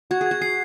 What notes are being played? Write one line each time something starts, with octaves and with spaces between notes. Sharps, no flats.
F#4 G#6
G#4
G#6
F#4
G#4 C7